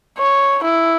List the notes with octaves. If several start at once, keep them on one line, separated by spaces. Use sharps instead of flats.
C#5
E4